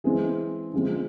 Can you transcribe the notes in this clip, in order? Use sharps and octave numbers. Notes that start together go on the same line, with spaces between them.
E3 G#3 C4 G#4
D3 F3 G#3 C4